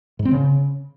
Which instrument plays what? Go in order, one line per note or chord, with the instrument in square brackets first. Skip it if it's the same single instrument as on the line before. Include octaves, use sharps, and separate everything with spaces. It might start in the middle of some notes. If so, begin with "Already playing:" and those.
[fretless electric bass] G#2
C4
C#3